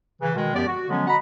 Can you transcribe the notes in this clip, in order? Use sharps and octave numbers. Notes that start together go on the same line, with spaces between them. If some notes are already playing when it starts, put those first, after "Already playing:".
C#3 E3
B2 D#3 G#3
F#2 F3 B3 G4 D5
F#4
D3 F3 F#3 G#3 B3 C#4
F#4 D#5 F#5 A#5 B5